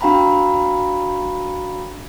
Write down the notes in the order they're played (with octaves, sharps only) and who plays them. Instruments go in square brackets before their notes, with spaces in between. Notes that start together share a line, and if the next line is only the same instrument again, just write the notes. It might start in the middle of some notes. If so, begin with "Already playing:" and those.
[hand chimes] D4 F#4 F5 G5 A#5 B5